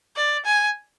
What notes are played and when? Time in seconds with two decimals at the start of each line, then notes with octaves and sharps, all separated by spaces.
0.16 D5
0.45 G#5